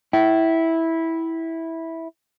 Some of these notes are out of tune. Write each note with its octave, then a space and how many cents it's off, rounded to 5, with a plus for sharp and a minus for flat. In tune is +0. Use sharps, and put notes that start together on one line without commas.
E4 -10 G5 -40